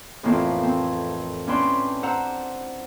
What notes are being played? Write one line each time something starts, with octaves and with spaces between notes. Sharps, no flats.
F2 A2 E3 A#3 C4 F4
C4
C#4 D4 E4 B4 G5 C6
C5 F#5 A#5 E6